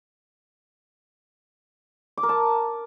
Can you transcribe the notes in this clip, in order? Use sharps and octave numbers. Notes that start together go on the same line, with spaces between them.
D6
A#4
A5